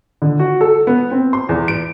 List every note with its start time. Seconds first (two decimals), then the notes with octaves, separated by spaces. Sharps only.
0.22 D3
0.39 F#4
0.61 A4
0.87 B3
1.11 C4
1.33 C6
1.49 E2
1.68 D7